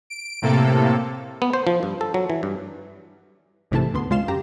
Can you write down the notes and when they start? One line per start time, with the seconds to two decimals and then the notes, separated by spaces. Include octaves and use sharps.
0.10 D7
0.42 A2 C3 A#3 A4
1.42 B3
1.54 C5
1.67 F3
1.83 G2
2.01 A4
2.14 F#3
2.30 E3
2.43 G2
3.71 A1 G#2 C3 E3 A3 A5
3.94 D2 B3 C6
4.11 C#3 G#3 F4 F5 C6 E7
4.28 F#2 G4 A#5